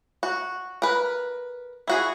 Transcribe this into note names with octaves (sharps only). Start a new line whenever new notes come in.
F#4
A#4 B4
E4 F#4 G#4